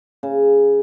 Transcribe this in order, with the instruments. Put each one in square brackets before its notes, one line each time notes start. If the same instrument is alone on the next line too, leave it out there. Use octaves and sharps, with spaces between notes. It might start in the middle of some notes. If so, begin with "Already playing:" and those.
[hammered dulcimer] C#3